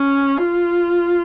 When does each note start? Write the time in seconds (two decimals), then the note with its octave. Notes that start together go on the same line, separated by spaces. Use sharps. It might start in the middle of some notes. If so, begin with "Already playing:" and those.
Already playing: C#4
0.37 F4